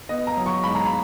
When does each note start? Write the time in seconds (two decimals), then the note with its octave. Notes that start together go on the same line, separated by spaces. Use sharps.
0.09 B3 D#5
0.27 A#5
0.37 F#3
0.46 C#6
0.64 G#2 B5
0.75 A#5
0.86 B5